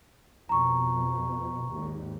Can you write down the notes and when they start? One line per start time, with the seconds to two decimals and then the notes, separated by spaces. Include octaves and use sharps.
0.49 F2 B2 A#5 C#6
1.70 G#1 D#2